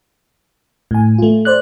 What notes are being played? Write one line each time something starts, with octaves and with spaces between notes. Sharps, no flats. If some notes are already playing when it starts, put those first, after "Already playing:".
A2 G#5
A3 F4
C5 D5 F#6